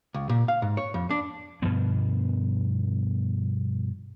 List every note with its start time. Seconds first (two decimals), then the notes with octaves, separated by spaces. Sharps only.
0.14 C#2
0.29 A#2
0.48 F5
0.62 G#2
0.77 C#5
0.94 F2
1.10 D4
1.62 G2 B2 F3 B3